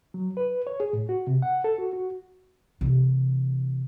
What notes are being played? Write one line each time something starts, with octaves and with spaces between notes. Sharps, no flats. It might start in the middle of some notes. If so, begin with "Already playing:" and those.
F#3
B4
C#5
G#4
A2
F#4
C3
F#5
A4
F#4
F#4
C3 E3